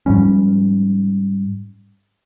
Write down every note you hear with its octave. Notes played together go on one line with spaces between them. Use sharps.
G#2 F3 G3 C#4